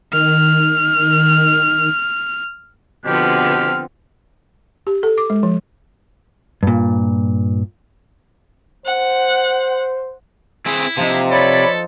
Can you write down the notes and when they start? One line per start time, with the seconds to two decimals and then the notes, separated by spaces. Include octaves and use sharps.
0.13 D#3 F6
3.06 B2 D3 F3 B3 C4 G4 F6
4.87 G4
5.03 A4
5.18 D6
5.30 G#3
5.43 F3
6.63 G2 A#2
8.86 C5 F#5
10.66 C4 E4 G#4
10.97 C3 F3 D#4
11.32 A4 C#5 D5 B5